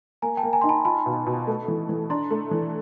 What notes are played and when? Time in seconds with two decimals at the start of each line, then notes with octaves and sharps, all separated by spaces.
0.22 A#3 G#5 A#5
0.37 G5 A5
0.43 A#3
0.53 G#5 A#5
0.61 D#4 C6
0.69 A5 B5
0.85 F4 A5 B5
1.06 B2
1.26 B2
1.47 A3
1.68 E3
1.89 E3
2.10 D4 A#5 C6
2.31 A3
2.51 E3